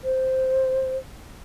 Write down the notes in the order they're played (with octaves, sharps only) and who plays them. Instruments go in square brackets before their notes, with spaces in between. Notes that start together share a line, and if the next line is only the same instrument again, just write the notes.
[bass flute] C5